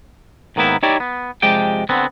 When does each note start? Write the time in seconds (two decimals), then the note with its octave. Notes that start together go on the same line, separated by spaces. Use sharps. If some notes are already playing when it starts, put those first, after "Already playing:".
0.56 G#2 D#3 A#3 B3 E4
0.83 D#4 E4 G4 C#5 D5
1.00 B3
1.42 C3 F3 G#3 G4 D5 G5
1.89 D3 B3 C4